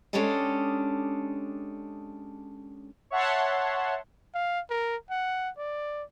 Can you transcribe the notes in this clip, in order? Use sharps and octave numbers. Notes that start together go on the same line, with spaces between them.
G#3 C#4 D4 G4 A4 D#5
C#5 E5 F#5 A5 C6
F5
A#4
F#5
D5